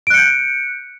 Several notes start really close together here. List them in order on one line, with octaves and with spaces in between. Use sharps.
D7 F#6 C#7 G6